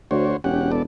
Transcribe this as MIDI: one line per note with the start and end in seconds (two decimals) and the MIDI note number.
0.11 0.34 38
0.11 0.37 66
0.11 0.37 72
0.11 0.37 73
0.44 0.83 28
0.44 0.71 61
0.44 0.71 67
0.44 0.71 78
0.72 0.82 59
0.72 0.82 69
0.72 0.82 74